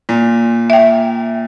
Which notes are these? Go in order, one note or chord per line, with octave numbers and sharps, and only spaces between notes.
A#2
E5 G5